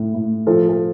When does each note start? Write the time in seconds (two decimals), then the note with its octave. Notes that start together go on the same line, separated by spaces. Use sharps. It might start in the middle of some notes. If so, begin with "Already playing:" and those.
Already playing: A2
0.14 A2
0.47 F3 A4
0.69 A4